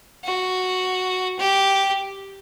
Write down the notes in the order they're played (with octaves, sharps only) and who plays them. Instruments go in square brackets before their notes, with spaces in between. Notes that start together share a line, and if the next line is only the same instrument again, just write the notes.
[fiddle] F#4
G4